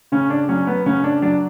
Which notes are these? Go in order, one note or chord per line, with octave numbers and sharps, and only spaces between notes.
C#3 C#4
D4
F#3 C#4
B3
C#3 C#4
D4
F#3 D4